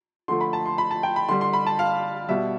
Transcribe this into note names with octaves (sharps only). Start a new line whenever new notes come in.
D3 F3 A3 C6
B5
A5
C6
B5
A5
G5
B5
D3 G3 C6
C6
B5
A5
F5
B2 G3 E5